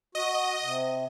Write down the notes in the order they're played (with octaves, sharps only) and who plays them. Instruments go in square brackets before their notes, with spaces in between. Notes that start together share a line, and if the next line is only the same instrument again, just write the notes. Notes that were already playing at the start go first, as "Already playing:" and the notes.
[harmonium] F#4 [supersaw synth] D#5
[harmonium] C3